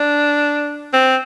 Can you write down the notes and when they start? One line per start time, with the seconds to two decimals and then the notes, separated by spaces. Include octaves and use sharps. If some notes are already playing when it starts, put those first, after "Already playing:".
Already playing: D4
0.93 C4